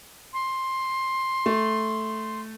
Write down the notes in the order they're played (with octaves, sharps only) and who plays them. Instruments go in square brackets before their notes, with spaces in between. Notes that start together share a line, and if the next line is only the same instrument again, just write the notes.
[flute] C6
[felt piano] A3